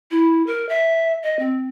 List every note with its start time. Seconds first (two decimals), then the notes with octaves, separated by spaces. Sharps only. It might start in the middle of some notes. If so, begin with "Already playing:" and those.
0.11 E4
0.47 A#4
0.69 E5
1.23 D#5
1.39 C4